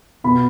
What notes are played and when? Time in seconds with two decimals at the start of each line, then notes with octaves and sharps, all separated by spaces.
0.24 B2 B3 B5